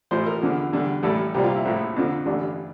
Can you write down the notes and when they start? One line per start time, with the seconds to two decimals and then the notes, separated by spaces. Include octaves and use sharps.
0.11 A1 A2 F3 C5
0.26 A#4
0.42 E2 D3 F3
0.73 E2 D3 G3
1.03 A1 A2 G3 A4
1.34 C2 A#2 G3 G4
1.44 F4
1.55 E4
1.65 A#1 A2 F3
1.96 F2 D3 F3
2.26 A1 G2 D3 D4